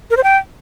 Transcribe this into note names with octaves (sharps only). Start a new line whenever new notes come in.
A#4
C5
G5